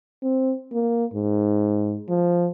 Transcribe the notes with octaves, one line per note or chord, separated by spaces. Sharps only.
C4
A#3
G#2
F3